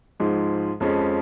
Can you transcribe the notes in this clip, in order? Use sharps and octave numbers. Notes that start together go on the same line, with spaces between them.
G#2 F3 G#3
F2 F3 G#3 C#4